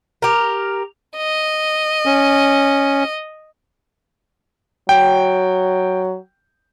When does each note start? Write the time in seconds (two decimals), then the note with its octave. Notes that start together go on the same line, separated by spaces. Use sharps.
0.22 G4 A#4
1.16 D#5
2.06 C#4
4.89 F#3 G5